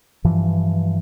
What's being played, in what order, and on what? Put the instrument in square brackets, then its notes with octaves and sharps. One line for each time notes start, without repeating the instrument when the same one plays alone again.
[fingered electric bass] G2 E3 F3